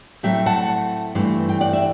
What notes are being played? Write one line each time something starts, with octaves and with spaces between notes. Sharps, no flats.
A2 F#3 A3 C4 E5 G5
F#5 A5
G2 E3 A3 C4
G5
D5 F#5
E5